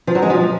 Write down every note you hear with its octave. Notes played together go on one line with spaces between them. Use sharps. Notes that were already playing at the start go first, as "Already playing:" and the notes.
F3
F#3
G#3
F3